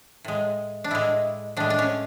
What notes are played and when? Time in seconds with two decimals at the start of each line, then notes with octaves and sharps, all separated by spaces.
0.24 A2 G#3
0.84 D4
0.91 A2 G#3 E4
1.57 A2 G#3 D4
1.70 D4
1.79 C#4